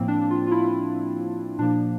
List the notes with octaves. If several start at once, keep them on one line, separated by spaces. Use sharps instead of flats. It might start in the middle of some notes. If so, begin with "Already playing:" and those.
Already playing: A2 F3 A#3 C4
D4
F4
F4
E4
F4
E4
A#2 F3 A#3 D4